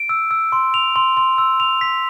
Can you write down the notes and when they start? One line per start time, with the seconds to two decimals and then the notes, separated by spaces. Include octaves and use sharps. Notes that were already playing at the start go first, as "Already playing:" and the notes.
Already playing: D7
0.09 E6
0.31 E6
0.52 C6
0.74 F7
0.96 C6
1.17 C6
1.38 E6
1.60 F7
1.81 B6